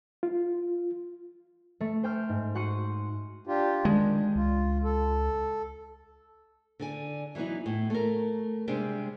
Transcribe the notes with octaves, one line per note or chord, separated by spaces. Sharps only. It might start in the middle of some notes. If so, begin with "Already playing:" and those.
F4
A3
C5 G5 F6
G#2
F#4 F#5 C6 C#7 D#7
D4 F4 G4
D#3 G#3 D4
C#2 F4
A4
D3 D5 G#5
E3 F#3 B3 D#4 E4
A2
A3 A#4
C3 G3 G#3 C4 D4 G4